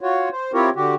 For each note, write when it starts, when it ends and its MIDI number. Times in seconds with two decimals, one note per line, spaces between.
0.01 0.29 65
0.01 0.29 66
0.01 0.29 73
0.32 0.52 72
0.53 0.70 60
0.53 0.70 64
0.53 0.70 65
0.53 0.70 67
0.53 0.70 70
0.53 0.70 73
0.76 0.95 50
0.76 0.95 66
0.76 0.95 67